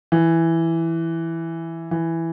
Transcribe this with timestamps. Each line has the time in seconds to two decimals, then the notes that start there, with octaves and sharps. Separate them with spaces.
0.12 E3
1.91 E3